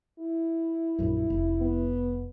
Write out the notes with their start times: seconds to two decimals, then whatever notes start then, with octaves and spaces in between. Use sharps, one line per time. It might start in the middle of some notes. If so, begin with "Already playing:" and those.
0.19 E4
0.99 A#1 F#2
1.30 F1
1.61 B3